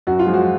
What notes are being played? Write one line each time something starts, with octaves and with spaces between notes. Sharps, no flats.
F#2 F#4
F4
F3 G#3
F#4